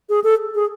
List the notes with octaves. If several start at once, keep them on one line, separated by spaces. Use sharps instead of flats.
G#4
A4
G#4